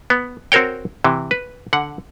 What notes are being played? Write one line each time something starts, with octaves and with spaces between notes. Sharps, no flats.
B3
C4 F#4 A#4 C#5 G5
C3 E3
B4
D3 F#5